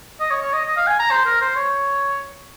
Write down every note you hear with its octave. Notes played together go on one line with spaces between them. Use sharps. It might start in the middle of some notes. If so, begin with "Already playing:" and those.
D#5
C#5
C#5
D#5
D#5
F5
G#5
A#5
C5
A#4
C5
C#5